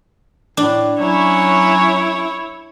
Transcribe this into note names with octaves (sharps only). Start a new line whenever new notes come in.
A2 D4
F#3 C#4 E4 C#5